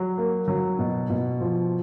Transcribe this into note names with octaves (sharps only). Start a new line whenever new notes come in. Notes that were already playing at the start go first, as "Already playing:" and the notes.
Already playing: F#3
A#3
F#3
B2
B2
F3